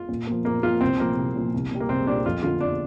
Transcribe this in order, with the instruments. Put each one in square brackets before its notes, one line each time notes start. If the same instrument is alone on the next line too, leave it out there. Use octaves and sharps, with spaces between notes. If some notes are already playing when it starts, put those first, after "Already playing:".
Already playing: [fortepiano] F4
[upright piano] A#2
F3 A#3
[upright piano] A#2 [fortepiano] A#3
[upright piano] F3 A#3 [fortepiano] F4
[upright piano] C2 [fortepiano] C4
[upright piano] A#2 F3 [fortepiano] A#3
[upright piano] C2
A#2 F3
C2
A#2 G3
[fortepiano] A#3
[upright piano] C2 [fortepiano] C4
[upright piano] A#2 G3 [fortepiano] D4
[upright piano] F2 [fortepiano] F4
[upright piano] D3 F3 [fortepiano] F4
[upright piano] F2 [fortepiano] D4